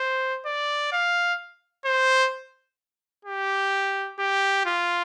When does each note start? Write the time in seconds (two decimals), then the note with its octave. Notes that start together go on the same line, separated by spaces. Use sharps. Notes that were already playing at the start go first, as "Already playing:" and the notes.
Already playing: C5
0.46 D5
0.92 F5
1.85 C5
3.25 G4
4.19 G4
4.66 F4